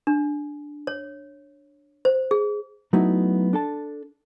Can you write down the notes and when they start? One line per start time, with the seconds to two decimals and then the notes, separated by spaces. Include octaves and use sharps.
0.07 D4
0.87 C#5
2.05 C5
2.31 G#4
2.93 F#3 A3 B3 D#4 E4
3.53 D4 A4 A5